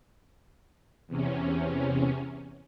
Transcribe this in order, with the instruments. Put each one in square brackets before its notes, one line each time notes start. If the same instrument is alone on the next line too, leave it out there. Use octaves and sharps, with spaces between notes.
[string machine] E2 C3 C#4